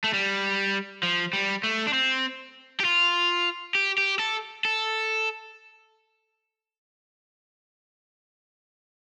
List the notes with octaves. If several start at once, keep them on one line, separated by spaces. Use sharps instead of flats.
A3
G3
F3
G3
A3
D4
C4
G4
F4
G4
G4
A4
A4